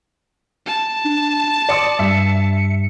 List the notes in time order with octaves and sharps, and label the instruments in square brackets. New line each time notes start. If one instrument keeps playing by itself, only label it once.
[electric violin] A5
[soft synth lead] D4
[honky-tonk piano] D5 C6 D#6 [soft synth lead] C#7
[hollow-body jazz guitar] G2 [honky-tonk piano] E5